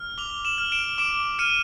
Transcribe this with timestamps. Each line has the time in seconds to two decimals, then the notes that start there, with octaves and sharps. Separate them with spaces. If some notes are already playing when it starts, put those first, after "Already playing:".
Already playing: F6
0.18 D6 F7 G7
0.45 E7 F#7
0.58 F6
0.72 D7 E7
0.98 D6 D7 E7
1.39 F6 C#7 D#7